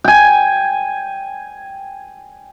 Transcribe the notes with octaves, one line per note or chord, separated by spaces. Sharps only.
G5 G#5